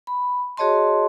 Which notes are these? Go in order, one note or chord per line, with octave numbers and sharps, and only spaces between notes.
B5
F#4 G#4 C#5 D#5 A5 C6